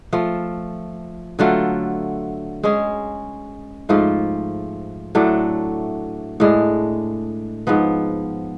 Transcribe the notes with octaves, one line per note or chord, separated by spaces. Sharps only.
F3 A3 F4
D3 F#3 A3 F4
G#3 C#4 G#4
G#2 F3 A3 F4
A2 F#3 A3 D4
A2 G#3 D4
G#2 F3 B3